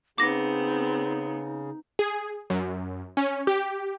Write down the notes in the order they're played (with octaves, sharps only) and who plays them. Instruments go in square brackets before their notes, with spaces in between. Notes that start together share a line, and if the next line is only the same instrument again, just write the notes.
[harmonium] C#3 [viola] B3 C4 [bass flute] D#4 [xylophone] D6 A#6
[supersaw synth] G#4
F#2
C#4
G4